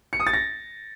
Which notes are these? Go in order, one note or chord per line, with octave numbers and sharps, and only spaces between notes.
C#7
D#6
A6
A#6